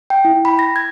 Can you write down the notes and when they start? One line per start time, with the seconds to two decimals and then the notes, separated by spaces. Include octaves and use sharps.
0.10 G5
0.25 E4
0.45 B5
0.59 A#6
0.76 G#6